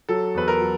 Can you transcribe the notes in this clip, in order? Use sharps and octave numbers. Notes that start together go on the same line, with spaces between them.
F#3 A4
E2 B4
A#4
F#3